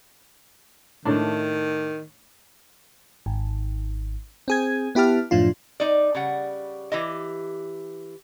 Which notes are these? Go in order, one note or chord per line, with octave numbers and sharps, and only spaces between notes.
A2 D#3 A3 D4
G#1
C4 G#4 G#6
B3 E4 G4 A5 F6
F#2 A2 F3 D4 F4
D#4 D5
C#3 G3 F#5
E3 G4 D#5